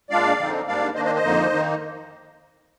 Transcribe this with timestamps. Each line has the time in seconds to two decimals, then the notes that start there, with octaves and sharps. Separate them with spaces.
0.10 A#2 G#3 D4 D5 F5
0.38 D3 F3 C4 D#4
0.67 G#2 G3 A#3 D4 D5 F5
0.95 D#3 A#3 D4 C5 D#5
1.05 C5 D#5
1.15 C5 D#5
1.24 F2 D3 F3 A#3 D#4
1.53 D#3 A#3 D#4